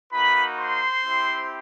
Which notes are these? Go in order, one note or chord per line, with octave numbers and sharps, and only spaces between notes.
A#3 D#4 F#4 B4 B5
C5 C6
C4 E4 G4